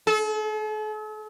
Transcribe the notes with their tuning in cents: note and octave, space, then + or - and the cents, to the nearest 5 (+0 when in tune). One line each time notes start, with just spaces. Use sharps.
A4 -45